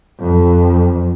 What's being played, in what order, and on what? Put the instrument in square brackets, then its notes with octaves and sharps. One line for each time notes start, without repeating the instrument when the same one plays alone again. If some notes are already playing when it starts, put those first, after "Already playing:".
[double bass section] F2